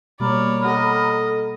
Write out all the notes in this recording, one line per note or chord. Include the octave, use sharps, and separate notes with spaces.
B2 G3 A#3 C#5 D5 A#5 B5 F6
G4 A4 D#5 F#5